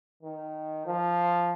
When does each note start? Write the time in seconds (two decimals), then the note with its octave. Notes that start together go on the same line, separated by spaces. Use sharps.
0.23 D#3
0.86 F3